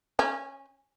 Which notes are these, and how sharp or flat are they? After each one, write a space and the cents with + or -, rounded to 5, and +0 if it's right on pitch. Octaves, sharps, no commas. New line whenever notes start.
C#4 -10 G#5 -40